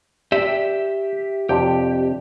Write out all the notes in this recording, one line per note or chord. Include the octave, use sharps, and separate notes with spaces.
G4 D5 E5
F2 C3 D4 G4